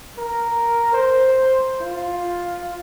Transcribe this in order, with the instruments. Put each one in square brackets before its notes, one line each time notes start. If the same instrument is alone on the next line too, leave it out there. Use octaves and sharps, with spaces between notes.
[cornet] A#4
C5
F4